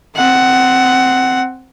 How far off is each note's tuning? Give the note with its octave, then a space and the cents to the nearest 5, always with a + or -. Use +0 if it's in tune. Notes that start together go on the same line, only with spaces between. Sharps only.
C4 +0 F#5 +15